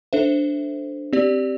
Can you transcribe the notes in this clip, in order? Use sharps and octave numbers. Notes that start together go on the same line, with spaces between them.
D4 A4 C5 E5
C4 G4 D5